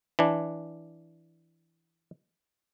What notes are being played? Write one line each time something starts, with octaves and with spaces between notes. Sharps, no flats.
E3 D4